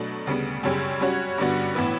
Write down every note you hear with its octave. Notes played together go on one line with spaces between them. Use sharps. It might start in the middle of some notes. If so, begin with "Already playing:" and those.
Already playing: B2 F#3 A3 D4
D2 C#3 G3 B3
F#2 C#3 G3 C#4 G4
G3 C#4 F#4 C#5
G2 D3 G3 B3 F#4
A2 E3 B3 E4 B4